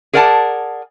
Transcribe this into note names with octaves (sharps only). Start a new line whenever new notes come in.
G#4 A#4 D5 F#5 G#5 A5